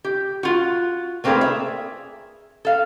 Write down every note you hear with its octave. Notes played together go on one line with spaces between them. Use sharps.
G4
F4 F#4
A3 A#3 C4 D4 G#4 B4
G#4 E5
A4 F5